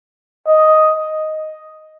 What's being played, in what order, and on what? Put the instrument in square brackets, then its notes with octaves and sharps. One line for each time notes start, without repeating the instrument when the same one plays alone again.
[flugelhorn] D#5